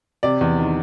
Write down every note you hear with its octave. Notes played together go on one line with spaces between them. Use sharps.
C3 D5
E2
D#3